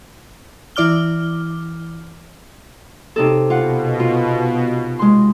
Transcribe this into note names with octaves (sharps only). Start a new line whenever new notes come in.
E3 E4 D5 D6 F6 G7
C3 D#4 A4
B2 F4 F#5
F4
G#3 C6